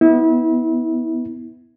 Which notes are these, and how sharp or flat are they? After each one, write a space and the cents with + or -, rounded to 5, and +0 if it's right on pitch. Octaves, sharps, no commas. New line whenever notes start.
B3 +0 E4 -30